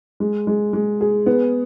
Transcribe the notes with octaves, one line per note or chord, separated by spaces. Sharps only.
G#3
G#3
G#3
G#4
B3